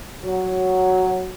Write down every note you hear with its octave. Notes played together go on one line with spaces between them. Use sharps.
F#3